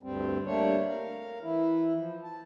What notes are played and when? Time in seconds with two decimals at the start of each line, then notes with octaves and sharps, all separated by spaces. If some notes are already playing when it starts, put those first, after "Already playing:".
0.03 D2 G2 G3 C4
0.47 G3 A3 A#3 D4 C#5
0.89 A#4 F5
1.43 E3 E4
1.97 F3
2.24 A5